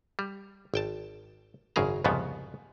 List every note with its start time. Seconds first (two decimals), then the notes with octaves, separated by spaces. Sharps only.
0.19 G3
0.74 G#1 G5 A5
1.76 G#1 F#2 C#3 G#4 A#5
2.04 C2 F2 G#2 C#3 F3 B3